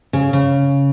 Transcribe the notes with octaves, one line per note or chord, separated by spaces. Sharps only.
C#3
C#3